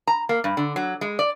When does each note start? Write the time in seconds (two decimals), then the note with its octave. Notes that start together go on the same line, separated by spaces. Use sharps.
0.07 A#5
0.29 A#3
0.44 G2
0.57 D3
0.76 F#3
1.01 G#3
1.19 D5